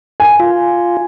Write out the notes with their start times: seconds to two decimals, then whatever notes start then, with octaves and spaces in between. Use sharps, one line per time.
0.20 G#5
0.40 F4